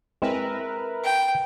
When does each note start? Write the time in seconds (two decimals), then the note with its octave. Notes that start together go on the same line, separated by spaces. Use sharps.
0.22 G#3 C4 E4 A#4 B4 E5
1.05 G5